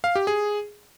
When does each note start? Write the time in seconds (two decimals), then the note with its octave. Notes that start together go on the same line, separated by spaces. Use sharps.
0.04 F5
0.15 G4
0.27 G#4